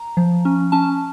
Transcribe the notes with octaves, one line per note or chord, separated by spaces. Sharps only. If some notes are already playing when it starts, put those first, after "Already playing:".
Already playing: A#5
F3
C#4
C#4 A5